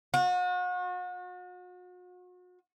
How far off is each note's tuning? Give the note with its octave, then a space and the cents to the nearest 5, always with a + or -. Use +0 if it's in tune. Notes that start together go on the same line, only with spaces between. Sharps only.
F#4 -40